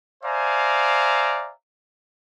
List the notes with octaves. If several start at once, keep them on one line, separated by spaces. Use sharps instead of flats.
C5 D5 E5 F5 G#5 A#5